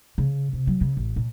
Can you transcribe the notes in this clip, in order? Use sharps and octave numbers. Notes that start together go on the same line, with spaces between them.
C#3
C3
F#3
C#3
A1
A#2